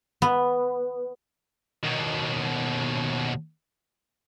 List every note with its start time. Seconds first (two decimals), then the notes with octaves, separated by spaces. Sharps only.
0.22 B3
1.84 D#2 B2